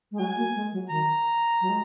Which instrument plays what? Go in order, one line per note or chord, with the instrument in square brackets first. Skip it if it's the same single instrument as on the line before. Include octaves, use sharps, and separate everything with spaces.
[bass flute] G#3
[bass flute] F#3 [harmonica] G#5
[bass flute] A#3
G#3
F#3
[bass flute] D#3 [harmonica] A#5
[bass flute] F#3
G#3